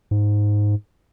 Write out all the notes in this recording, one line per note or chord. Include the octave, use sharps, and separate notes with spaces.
G#2